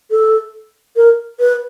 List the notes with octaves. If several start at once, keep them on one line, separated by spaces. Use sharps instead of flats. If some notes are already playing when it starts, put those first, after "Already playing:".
A4
A#4
B4